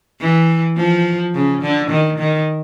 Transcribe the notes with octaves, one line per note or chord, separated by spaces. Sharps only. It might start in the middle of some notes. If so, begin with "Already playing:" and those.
E3
F3
C#3
D3
D#3
D#3